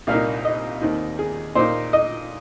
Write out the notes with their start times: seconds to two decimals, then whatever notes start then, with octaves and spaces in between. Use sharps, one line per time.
0.07 C2 A#2 A#3 D#4 F5
0.45 D#5
0.81 D#2 D#3 C4 D#4
1.19 G#4
1.55 A#2 A#3 D#4 C5
1.93 D#5